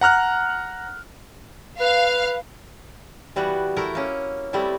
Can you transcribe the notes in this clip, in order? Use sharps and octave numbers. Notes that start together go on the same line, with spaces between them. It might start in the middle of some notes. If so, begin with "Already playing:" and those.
F#5 A#5 F6 F#6
B4 F5
E3 G3 B3 F#4
A3 E4 A#4 A#5
A#3 C#4
G3 A3 C4 E4